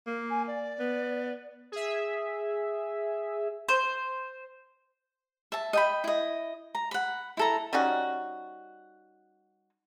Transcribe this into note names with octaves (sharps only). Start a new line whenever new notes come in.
A#3
G#5
D5
B3
G#4 E5
C5
E5 A5
D#5 G5 B5
E4 D#5
A#5
F#5 B5
E4 A4 A#5
G3 C#4 D#4 F#4